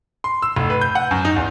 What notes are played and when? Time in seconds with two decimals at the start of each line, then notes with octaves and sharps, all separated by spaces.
0.24 C6
0.42 E6
0.56 F1
0.70 B4
0.81 G6
0.95 F#5
1.11 F#2
1.25 D#4
1.36 E2